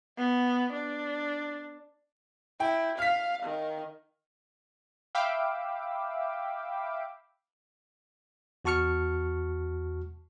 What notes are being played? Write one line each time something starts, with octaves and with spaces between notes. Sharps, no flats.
B3
D4
E4 G5
F5 F6 B6
D#3
E5 F5 G5 B5 D6 E6
E2 F#4 A5 C#6 F6 C#7